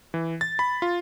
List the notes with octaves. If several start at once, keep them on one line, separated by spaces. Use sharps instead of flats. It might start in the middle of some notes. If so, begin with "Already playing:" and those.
E3
A6
B5
F4